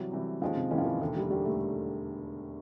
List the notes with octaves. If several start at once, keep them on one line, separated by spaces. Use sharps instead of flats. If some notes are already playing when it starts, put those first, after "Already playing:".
Already playing: C3 E3 F#3 G3
C3 E3 G3
D#2 D#3 F3 G#3 C#4
C3
D#2 D#3 E3 G#3 C#4
F3
E3
E1 D#2 D3 E3
G3
E1 D#2 D3 G3
A3